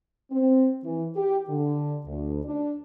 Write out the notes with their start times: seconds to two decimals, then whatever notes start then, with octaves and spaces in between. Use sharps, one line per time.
0.31 C4
0.84 E3
1.16 G4
1.49 D3
2.06 D2
2.45 D4